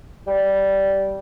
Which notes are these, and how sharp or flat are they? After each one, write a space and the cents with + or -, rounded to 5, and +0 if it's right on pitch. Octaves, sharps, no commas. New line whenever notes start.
G3 -10